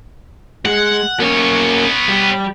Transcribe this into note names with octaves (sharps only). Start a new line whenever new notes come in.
G#3 F#5
A#3 B3 C#4 C#5
G3